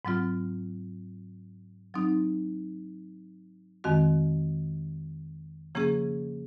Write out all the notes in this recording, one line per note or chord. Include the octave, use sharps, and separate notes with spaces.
G#2 F#3 C4 F4
F#3 C4 D#4
F2 D#3 G#3 C4 F#4
C#3 F3 A#3 C#4 G#4